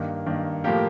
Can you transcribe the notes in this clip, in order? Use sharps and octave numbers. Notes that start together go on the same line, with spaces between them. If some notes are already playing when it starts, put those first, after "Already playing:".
Already playing: G2 D#3 A#3
G2 D#3 A#3
A2 F3 A#3 G4 A#4